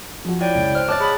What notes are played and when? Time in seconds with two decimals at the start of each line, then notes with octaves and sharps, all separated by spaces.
0.25 F3 F#4
0.40 E4 C#5 D5 G5
0.55 C#2
0.75 C5 F6 F#6
0.88 C#5 D#5 A5 D6 F#6 A6
1.00 G#4 B5 D#6